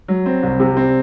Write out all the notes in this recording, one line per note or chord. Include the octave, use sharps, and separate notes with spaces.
F#3
C4
C2
C3
C4